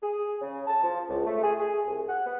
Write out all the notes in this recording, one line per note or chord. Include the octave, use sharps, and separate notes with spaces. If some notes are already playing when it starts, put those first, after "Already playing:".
G#4
C#3
A5
F3
C#2
A3
G#4
G#4
C2
F#5
B3